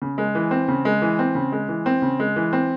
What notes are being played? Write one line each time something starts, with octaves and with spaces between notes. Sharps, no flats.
C#3
G#3
E3
C4
C#3
G#3
E3
C4
C#3
G#3
E3
C4
C#3
G#3
E3
C4